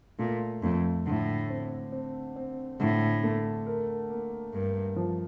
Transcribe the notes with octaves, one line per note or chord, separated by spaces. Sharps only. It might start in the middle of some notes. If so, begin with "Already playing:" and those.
A#2 A3
F2 A3
A2 D3
C4
C4
C4
A2 D3
A3
A#4
A#3
G2 A#4
F3